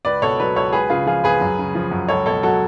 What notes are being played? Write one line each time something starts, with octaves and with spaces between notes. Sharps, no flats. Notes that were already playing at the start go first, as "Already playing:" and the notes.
C#2 B4 D5
B2 A4 C#5
F#3 B4 D5
C#2 A4 C#5
C#2 G#4 B4
C#3 F4 G#4
F3 F4 G#4
C#2 G#4 B4
F#2
C#3
F3
F#2
C#2 A4 C#5
B2 A4 C#5
F#3 F#4 A4